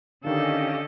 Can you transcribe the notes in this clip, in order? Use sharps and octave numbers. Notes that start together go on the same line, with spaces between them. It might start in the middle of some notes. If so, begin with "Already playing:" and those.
D3 D#3 C#4 D4 G4 A4 D#5 F5